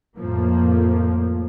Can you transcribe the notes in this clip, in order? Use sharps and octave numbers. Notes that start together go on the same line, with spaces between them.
F2 A2 F3 A#3